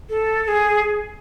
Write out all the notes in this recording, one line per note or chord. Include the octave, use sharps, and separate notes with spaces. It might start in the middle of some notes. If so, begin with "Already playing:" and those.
A4
A4
G#4